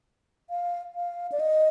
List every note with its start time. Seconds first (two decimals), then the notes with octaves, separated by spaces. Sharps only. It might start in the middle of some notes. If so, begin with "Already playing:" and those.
0.50 F5
0.95 F5
1.32 D5
1.40 D#5